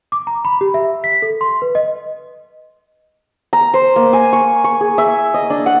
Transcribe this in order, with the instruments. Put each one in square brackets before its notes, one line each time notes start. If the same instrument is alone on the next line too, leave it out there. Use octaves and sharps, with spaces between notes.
[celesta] D6
A#5
B5
G4
E5
B6
A4
C6
B4
D#5
[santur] A#5
C5
A#3
G#5
C#6
C#6
G#4
E5
D#5
D4
F#5